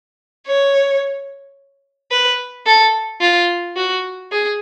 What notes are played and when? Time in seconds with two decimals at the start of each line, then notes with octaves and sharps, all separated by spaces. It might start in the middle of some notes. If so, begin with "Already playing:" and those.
0.47 C#5
2.11 B4
2.66 A4
3.21 F4
3.76 F#4
4.31 G#4